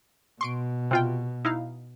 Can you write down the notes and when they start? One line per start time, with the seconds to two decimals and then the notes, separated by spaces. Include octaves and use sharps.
0.41 B2 C6 C#6 D7
0.91 C3 F4 G5
1.45 D#4 E4 F5